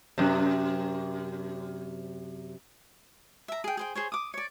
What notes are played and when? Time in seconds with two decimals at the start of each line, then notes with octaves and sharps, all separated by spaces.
0.18 F#2 C3
3.48 E5 A#5
3.64 G#4 G5
3.77 G#4 C5 G5
3.95 G#4 C5 C#5
4.12 D6 D#6
4.34 C#5 D5